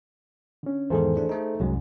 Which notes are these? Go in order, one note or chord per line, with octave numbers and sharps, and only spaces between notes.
D3 C#4
E2 G#2 D#3 G#4 A4 C5
E3 A3 D4
A3 D#4
C2 F#2 F#3 G#3